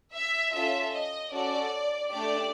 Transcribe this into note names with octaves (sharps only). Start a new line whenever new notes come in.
E5
C#4 F4 A4 E5
D#5
C#4 F#4 A4 D5
A3 D4 G4 D5